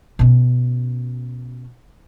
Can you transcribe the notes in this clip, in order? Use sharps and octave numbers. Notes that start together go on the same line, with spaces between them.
B2 C#4